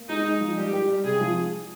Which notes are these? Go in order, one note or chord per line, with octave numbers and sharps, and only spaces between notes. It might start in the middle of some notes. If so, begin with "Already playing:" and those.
Already playing: A#3
G#3 D#4
G#3
F3
G3 G4
G4
G3
C3 G#4
F3